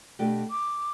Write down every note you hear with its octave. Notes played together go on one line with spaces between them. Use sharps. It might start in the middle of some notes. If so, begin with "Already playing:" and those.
B2 A3 D4 G4
D6